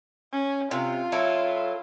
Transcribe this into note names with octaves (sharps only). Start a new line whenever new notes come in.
C#4
C3 F4
F#3 E4 A4